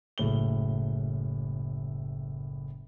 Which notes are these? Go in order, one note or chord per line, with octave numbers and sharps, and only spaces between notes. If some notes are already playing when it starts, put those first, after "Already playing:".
F#1 A2 G7